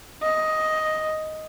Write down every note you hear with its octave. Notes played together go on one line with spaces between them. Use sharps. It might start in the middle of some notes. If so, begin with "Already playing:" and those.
D#5